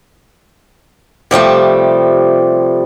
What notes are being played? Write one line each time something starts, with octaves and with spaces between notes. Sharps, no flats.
C3 F3 G3 A3